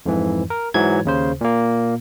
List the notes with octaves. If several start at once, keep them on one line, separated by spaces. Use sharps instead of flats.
F2 G#2 E3
A#4
G#2 E3 F#3 G#6
D#2 C#3 C5
A#2 A#3